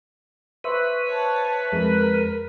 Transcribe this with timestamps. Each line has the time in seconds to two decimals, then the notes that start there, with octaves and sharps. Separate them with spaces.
0.64 B4 C5 E5 C#6
1.06 C#5 A5
1.72 F2 G#3 A#4